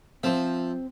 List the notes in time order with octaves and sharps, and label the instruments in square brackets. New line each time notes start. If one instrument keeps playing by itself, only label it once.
[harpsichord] F3 E5 [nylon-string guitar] C4 C5